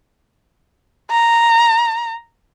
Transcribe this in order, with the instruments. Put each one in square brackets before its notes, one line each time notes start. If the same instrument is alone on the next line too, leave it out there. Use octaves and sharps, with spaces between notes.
[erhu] A#5